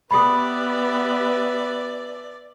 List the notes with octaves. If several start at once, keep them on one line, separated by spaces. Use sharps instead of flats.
B3 G4 B4 D5 E5 B5 D#6